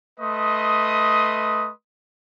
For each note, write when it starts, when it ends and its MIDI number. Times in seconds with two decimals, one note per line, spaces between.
0.19 1.70 57
0.19 1.70 71
0.19 1.70 75
0.19 1.70 84
0.19 1.70 87